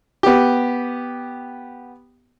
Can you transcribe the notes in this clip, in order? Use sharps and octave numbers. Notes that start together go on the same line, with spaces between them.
B3 G4